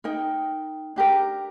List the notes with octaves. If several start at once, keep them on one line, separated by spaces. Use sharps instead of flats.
D#4 A#4 G5
D4 G4 A#4